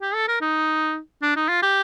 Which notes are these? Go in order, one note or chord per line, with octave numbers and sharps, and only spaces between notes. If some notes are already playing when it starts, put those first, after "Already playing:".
G4
A4
A#4
D#4
D4
D#4
F4
G4